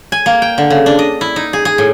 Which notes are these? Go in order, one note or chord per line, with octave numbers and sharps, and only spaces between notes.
G#5
A#3
G5
D3
C#3
D4
D#5
E4
D#4
G#4
G#4
A2